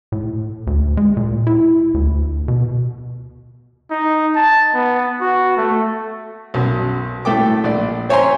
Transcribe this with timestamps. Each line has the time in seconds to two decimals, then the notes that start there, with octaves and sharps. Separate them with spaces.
0.12 A2
0.67 D2
0.97 G#3
1.17 A#2
1.47 E4
1.94 D2
2.48 B2
3.91 D#4
4.35 A5
4.74 B3
5.21 F#4
5.57 A3
6.54 B1 F#2
7.25 A2 A3 A4 G5 D6
7.64 A#1 D5
8.09 C5 C#5 E5 G#5 A#5 C6